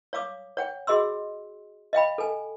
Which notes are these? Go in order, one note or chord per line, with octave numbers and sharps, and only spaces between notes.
C#5 F5 D6 D#6
C#5 F#5 G5
F#4 G#4 D#5 C6 E6
D#5 F5 G5 B5
A4 G#5